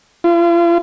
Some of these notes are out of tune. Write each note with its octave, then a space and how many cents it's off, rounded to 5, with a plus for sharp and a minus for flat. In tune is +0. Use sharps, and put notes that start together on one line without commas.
F4 -40